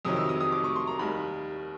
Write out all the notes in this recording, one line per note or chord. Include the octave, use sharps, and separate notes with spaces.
F2 C3 D#3 F#3 D#6
E6
D#6
D#6
D6
C#6
C6
A#5
D#2 D#3 G3 B5